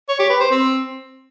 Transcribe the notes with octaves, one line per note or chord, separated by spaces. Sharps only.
C#5
G4
B4
C5
C4